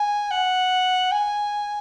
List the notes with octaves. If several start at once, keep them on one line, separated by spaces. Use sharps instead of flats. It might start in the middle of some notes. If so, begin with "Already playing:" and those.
Already playing: G#5
F#5
G#5